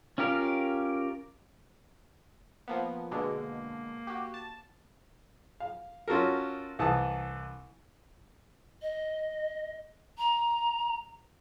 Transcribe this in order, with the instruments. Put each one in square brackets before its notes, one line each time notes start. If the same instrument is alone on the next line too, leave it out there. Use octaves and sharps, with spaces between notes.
[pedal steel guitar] C#4 F4 G4 A#4 F5
[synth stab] F3 A#3 B3
[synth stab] B2 D3 G#3 [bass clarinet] A#3
[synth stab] F#4 G4
A5
[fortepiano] F5
C#4 F4 F#4 A4 A#4
C2 E3 A5 D#6
[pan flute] D#5
A#5